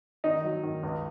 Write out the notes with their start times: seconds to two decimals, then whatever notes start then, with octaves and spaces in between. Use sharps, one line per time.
0.24 D#3 D#4
0.44 F#3
0.63 D#3
0.83 C#2